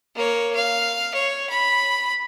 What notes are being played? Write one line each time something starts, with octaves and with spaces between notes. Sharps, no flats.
A#3 C#5
F5
C#5
B5